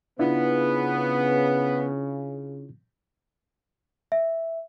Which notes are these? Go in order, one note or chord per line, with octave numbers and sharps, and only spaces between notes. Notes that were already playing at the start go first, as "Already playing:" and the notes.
C#3 B3 D4 E4 F4
E5